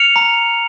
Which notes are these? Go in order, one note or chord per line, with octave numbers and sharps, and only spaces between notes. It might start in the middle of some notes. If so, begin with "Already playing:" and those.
Already playing: F6 C#7 F7
A#5